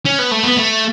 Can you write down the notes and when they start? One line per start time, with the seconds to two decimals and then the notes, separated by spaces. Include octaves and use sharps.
0.05 C#4
0.19 B3
0.31 A3
0.44 B3
0.57 A3